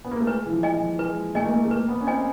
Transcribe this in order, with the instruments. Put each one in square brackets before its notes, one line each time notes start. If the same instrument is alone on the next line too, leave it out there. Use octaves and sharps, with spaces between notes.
[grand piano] B3
A#3
A3
[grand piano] G#3 [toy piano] B4
[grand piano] E3
F3
[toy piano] D#5 G#5
[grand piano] F3
[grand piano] G#3 [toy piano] B4
[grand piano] A3 [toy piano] D#5 G#5
[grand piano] A#3
A3
A3
[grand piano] A#3 [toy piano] B4
[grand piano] B3
C#4
[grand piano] C4 [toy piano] D#5 G#5